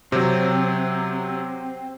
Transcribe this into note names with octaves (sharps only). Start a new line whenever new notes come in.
C3 F#3 C4